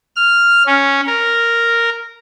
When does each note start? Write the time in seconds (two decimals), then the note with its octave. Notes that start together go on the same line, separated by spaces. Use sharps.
0.16 F6
0.66 C#4
1.07 A#4